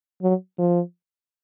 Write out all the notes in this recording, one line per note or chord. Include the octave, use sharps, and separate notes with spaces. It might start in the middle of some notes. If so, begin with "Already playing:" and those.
F#3
F3